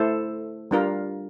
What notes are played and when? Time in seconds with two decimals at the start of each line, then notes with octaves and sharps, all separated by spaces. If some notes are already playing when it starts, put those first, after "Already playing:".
Already playing: A3 E4 A4 C5
0.71 G3 D4 F4 A#4